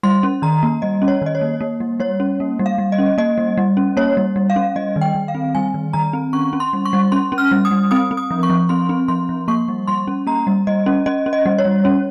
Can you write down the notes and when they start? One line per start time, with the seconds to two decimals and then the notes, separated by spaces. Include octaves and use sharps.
0.03 G3 C6
0.23 C#4
0.42 D#3 A#5
0.63 A#3
0.82 G3 D#5
1.02 C#4
1.08 C#5
1.22 D#3 D#5
1.35 C#5
1.41 A#3
1.61 A#3
1.80 G3
2.00 G3 C#5
2.20 C#4
2.40 A#3
2.59 G3
2.66 F5
2.78 G3
2.92 D#5
2.98 C#4
3.18 A#3 D#5
3.38 G3
3.58 G3
3.77 C#4
3.97 A#3 C#5
4.17 G3
4.36 G3
4.50 F5
4.56 C#4
4.76 G3 D#5
4.96 D#3
5.01 G5
5.15 D#3
5.28 F5
5.35 C4
5.55 G3 G#5
5.74 D#3
5.93 D#3 A#5
6.13 C4
6.33 C#4 C#6
6.53 C#4
6.60 C6
6.73 G3
6.85 C#6
6.93 G3
7.12 C#4 C6
7.32 C#4
7.38 F6
7.51 G3
7.65 D#6
7.71 G3
7.91 C4 D#6
8.11 C4
8.17 D#6
8.31 F3
8.43 C#6
8.50 F3
8.69 C4 C6
8.89 C4
9.08 F3 C6
9.29 F3
9.48 A#3 C#6
9.68 G3
9.87 G3 C6
10.08 C#4
10.27 A#3 A#5
10.47 G3
10.67 G3 D#5
10.86 C#4
11.06 C#4 D#5
11.26 C#4
11.33 D#5
11.46 G3
11.58 C#5
11.65 G3
11.85 C#4